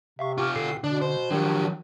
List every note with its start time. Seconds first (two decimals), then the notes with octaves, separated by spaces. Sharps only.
0.19 C3 E5 F5 C#6
0.38 F4 G4 C#6 D6 F6
0.56 B2 D3 A4 C7
0.84 B2 D3 D4
1.01 C5
1.31 D#3 F3 F#3 D4 G4